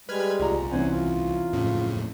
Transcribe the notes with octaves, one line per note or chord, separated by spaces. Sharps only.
G3 G#3 B4 F6 G#6
C2 F4 D5 A#5
C3 E3 C#4 C5 F#5 G#5
F4
F2 A2 C#3